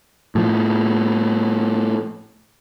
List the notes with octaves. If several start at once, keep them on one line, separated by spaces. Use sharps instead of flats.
A2 F3